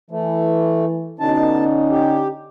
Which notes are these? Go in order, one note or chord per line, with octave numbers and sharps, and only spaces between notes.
E3 A3
B2 D3 C#4 D#4 A5
G4